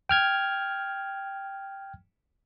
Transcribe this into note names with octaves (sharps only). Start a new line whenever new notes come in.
G5 F6 G#6